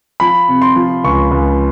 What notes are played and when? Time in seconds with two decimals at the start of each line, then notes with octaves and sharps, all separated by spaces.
0.20 F3 B5
0.49 C3
0.62 C6
0.76 F3
1.04 C#2 C#6
1.31 C#2